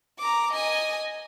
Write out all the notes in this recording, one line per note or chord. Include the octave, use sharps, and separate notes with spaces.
A#5 D6
D#5 G#5